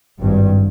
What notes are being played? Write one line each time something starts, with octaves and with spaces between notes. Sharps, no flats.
G#1 G2